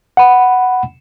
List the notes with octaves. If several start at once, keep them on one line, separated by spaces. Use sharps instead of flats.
F#5 B5